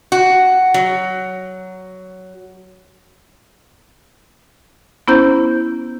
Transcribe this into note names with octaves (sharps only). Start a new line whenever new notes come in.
F#4
F#3
B3 C#4 E4 C5 A#5 G6